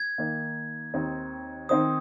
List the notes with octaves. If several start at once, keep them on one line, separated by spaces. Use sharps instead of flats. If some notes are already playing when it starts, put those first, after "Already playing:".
Already playing: G#6
D#3 A#3 D#4
D#2 D#3 C4 D#4
D#3 C4 D#4 C5 D#6